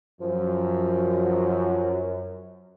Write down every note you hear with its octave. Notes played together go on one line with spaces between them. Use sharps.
F#2 F3